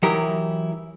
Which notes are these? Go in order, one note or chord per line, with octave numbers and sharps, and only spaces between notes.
E3 F#3 D#4 E4 G4 A#4